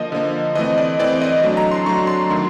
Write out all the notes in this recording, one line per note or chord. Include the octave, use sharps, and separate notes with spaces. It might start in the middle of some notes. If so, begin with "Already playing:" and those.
Already playing: D3 F3 A#3 D#5
D3 F3 A#3
E3 A3 C4 D#5
D5
E3 A3 C4 D5
D#5
F#3 A3 D4
A#5
C6
F#3 A3 D4 C#6
C6
D#3 F#3 A3 D4